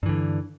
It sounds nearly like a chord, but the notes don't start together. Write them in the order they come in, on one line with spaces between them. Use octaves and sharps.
G2 E3 D3